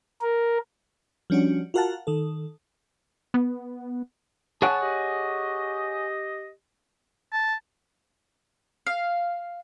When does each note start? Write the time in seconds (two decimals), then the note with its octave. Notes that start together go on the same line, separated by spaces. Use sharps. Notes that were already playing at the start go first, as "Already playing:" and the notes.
0.22 A#4
1.30 F3 G3 C#4 D4 F#4
1.74 F4 F#4 A#4 F5 F#5 A5
2.07 D#3 A4
3.34 B3
4.62 G#4 C#5 F#5 A5
4.82 G4 D#5
7.33 A5
8.87 F5